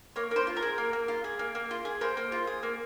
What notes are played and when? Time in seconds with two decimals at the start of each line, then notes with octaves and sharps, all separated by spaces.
0.16 A#3 C#5
0.31 A#3 C5
0.47 F4
0.57 A#4
0.62 G#4
0.78 A#3
0.93 A#3
1.08 F4
1.24 G#4
1.39 A#3
1.55 A#3
1.71 F4
1.85 G#4
2.01 A#3 C5
2.17 A#3
2.32 F4
2.47 G#4
2.63 A#3